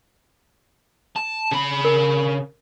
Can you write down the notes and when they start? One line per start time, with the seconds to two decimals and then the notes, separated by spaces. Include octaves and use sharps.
1.16 A5
1.51 C#3 B5
1.85 A#4